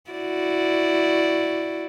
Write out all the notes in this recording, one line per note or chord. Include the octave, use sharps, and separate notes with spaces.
E4 F#4 D5